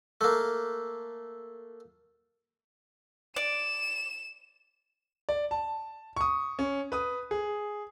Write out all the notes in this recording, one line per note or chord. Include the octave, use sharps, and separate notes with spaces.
A3 A#3
D5 E7
D5
A5
C#6 D#6
C#4
B4 D#6
G#4